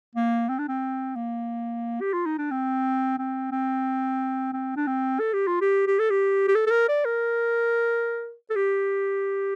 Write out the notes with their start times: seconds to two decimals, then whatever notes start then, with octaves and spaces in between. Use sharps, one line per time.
0.15 A#3
0.49 C4
0.58 D4
0.68 C4
1.16 A#3
2.01 G4
2.13 F4
2.26 D#4
2.38 D4
2.51 C4
3.18 C4
3.52 C4
4.53 C4
4.76 D4
4.87 C4
5.20 A4
5.33 G4
5.47 F4
5.61 G4
5.87 G4
5.99 A4
6.10 G4
6.48 G4
6.55 A4
6.67 A4
6.70 A#4
6.88 D5
7.05 A#4
8.50 A4
8.56 G4